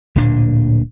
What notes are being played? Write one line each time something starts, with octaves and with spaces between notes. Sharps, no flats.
D1 A#2 A#3 D4